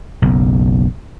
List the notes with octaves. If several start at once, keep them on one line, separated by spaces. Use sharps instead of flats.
F#1 B1